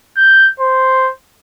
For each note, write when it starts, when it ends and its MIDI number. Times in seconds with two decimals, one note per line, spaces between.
0.17 0.46 91
0.60 1.10 72